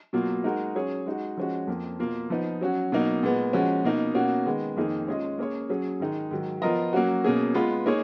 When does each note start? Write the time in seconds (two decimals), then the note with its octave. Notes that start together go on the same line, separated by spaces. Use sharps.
0.13 B2 F#3 A#3 F4
0.44 G#3 D#4 F#4 A#4
0.75 F#3 C#4 G#4 C#5
1.06 G#3 D#4 F#4
1.37 F3 G#3 C#4 F#4
1.67 F2 F3 A#3
1.99 B2 A#3 F4
2.30 F3 B3 D#4
2.61 F#3 C#4 F#4
2.92 B2 F#3 A#3 D#4
3.23 A#2 G#3 B3
3.53 F3 G#3 C#4 F#4
3.84 B2 A#3 D#4
4.14 B2 A#3 C#4 F#4
4.46 D#3 G#3 B3
4.77 F2 D#3 A#3 D#4 G#4
5.07 G#3 C#4 F4 G#4 D#5
5.38 A#3 C#4 G#4 C#5
5.69 F#3 C#4 G#4
6.00 G#2 D#3 G#3 D#4
6.31 G#2 D#3 F#3
6.62 F3 B3 F4 A#4 D#5
6.93 F#3 A#3 C#4 F#4
7.24 B2 A#3 C#4 G#4
7.54 G#3 B3 F4 B4
7.86 A#3 D#4 G#4 C#5